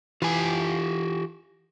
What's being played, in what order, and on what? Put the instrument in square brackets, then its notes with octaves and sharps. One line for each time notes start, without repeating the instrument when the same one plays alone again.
[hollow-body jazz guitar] E3 [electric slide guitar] F4 G4 G#5